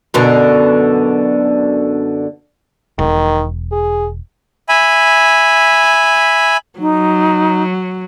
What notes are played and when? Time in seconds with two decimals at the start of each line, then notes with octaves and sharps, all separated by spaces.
0.14 F#2 B2 D3
2.99 E1 D#3
3.72 G#4
4.69 E5 G#5 B5
6.79 F#3 D#4